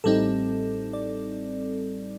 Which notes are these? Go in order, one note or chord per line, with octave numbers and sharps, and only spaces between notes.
A1 A2 G3 C4 D#4 A4
D5